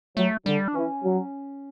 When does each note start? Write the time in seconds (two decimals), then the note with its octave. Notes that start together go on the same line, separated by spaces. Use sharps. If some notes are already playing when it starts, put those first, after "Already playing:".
0.17 F#3 A3
0.46 D3 G3
0.68 D4
0.75 E3 C#4
1.04 F#3